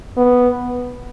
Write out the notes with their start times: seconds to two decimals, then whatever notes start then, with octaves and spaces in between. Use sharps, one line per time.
0.17 B3